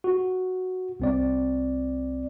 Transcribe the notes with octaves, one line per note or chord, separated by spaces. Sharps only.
F#4
C2 C4 D5